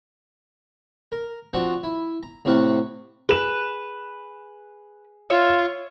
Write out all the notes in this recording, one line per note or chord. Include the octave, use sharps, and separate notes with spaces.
A#4
F3 C4 D4 F#4 C#6
E4
A#5
A2 C3 C4 F5 F#5 C#6
G#4 B4 E7
F4 C#5 E5